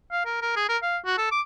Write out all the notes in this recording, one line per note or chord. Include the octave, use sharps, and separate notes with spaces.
F5
A#4
A#4
G#4
A#4
F5
F#4
A4
D6